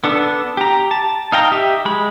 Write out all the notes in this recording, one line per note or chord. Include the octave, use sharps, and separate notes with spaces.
B3 D4 A4
G4 A#5
A5
D#4 F5 G5 A#5
G4 D#5 E5
G#3 B5